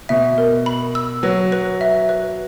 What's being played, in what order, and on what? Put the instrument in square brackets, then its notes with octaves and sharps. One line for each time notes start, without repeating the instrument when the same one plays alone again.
[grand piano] B2 [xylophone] E5
[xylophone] A#4
B5
E6
[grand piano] F#3 [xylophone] B4
[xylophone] B4
E5
B4